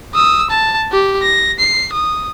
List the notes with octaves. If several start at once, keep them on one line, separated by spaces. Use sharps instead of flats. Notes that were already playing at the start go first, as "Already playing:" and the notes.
D#6 E6
A5
G4
A#6
C7
D#6